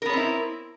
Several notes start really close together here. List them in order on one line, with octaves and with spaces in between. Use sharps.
A#4 B3 C#5 C4 E4